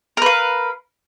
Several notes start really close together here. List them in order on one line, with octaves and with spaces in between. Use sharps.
A#4 B4 F5